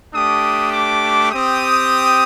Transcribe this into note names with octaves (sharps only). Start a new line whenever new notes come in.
A3 D4 G4 D#6
D6
C4 G4 D#6